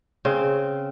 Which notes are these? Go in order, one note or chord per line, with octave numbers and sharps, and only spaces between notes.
C#3 C4